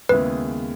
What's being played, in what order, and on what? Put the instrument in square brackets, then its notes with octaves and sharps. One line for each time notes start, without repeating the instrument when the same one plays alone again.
[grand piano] D#2 C#3 G#3 B3 E4 [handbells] B4